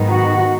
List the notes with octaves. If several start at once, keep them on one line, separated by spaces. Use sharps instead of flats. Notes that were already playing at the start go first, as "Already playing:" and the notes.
Already playing: G#2 D#3 F#3 B3 D#4
F#4